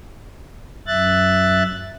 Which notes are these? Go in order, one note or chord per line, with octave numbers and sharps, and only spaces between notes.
F#2 E5 F#6 A6